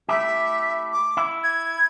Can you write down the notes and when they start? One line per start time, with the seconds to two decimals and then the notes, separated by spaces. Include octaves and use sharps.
0.09 A3 E4 G4 E5
0.92 D6
1.17 E4
1.44 G#6